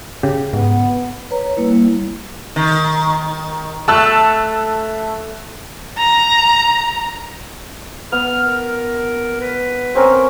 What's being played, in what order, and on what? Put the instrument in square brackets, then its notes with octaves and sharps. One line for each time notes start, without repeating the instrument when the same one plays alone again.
[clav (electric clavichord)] C#3 G4
[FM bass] G#2 [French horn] B3
[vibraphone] B4 C#5 A#5
G3 A#3 E4
[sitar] D#3
[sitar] A3 [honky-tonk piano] A5 E6 F#6
[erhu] A#5
[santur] B3 [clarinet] F6
[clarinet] A#4
B4
[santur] C4 C#4 A#4